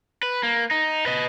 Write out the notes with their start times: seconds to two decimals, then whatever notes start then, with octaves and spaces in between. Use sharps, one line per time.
0.23 B4
0.43 A#3
0.71 D#4
1.06 B4 D#5